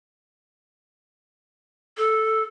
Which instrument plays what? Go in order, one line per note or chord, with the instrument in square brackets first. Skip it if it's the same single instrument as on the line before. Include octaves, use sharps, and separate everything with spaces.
[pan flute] A4